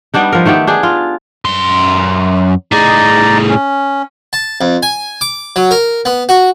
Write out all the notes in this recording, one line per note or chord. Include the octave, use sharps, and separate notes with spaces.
G3 B3 D4 D#4
F3 A#4
D#3 A3 B3 G4
D4 G4 G#4
F4
F#2 C6
A2 D#4 G#4 D5 D#5
C#4
A5
F2
G#5
D6
F#3
A#4
B3
F#4